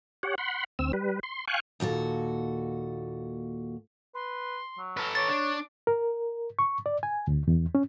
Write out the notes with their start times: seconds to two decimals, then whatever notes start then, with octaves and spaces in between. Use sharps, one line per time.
0.23 G4 C#5 F#5
0.38 F#5 B5 C6
0.79 D2 C4 E6
0.93 G3 B4
1.23 C6
1.48 F5 G5 G#5 C#6 F#6
1.80 D#2 A#2 F#4 A4
4.15 B4 C6
4.78 F#3
4.97 A4 B4 F6
5.15 C#5 D6 A6
5.28 D4
5.87 A#4
6.59 C#6
6.86 D5
7.03 G#5
7.27 D2
7.48 E2
7.75 C#4